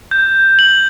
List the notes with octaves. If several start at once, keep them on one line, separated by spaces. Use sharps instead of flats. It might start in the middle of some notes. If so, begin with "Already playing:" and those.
G6
F#7